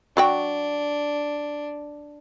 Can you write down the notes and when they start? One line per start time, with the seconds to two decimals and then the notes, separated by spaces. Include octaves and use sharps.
0.17 F#3 D4 F#4 G5